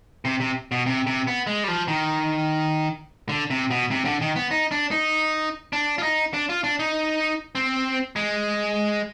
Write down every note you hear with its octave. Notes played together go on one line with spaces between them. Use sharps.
C3
C3
B2
C3
C3
B3
G#3
G3
F3
D#3
D3
C3
B2
C3
D3
D#3
B3
D#4
D4
D#4
D4
F4
D#4
D4
F4
D4
D#4
C4
G#3